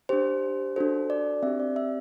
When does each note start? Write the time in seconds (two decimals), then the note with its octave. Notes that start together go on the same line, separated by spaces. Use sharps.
0.09 D4 G4 C5
0.76 D4 F#4 A4 C5
1.10 D5
1.43 C4 G4 E5
1.60 D5
1.76 E5